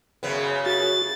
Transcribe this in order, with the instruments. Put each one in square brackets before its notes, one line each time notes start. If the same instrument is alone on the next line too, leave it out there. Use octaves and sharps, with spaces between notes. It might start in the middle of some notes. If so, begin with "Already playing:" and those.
[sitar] F#2 C#3 B3
[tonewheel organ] F#4 [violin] A6